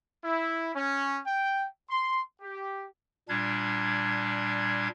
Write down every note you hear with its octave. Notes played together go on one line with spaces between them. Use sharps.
E4
C#4
G5
C6
G4
A#2 G3 D4 G#6